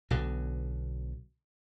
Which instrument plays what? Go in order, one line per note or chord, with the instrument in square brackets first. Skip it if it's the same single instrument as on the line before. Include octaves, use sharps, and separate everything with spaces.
[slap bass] B1 B2 D3